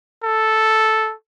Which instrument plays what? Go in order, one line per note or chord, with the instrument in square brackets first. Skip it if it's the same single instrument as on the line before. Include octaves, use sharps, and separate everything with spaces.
[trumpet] A4